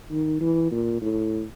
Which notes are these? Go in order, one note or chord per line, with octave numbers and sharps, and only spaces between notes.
D#3
E3
A#2
A2